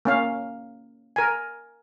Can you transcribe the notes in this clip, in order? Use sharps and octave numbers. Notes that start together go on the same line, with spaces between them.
A#3 C#4 F5
A#4 G#5